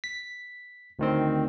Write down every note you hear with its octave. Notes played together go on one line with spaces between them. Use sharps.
B6
D2 D#3 C4